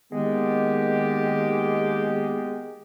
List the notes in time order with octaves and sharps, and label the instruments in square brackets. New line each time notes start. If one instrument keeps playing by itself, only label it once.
[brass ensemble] D#3 A#3 G4 [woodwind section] G#3 B3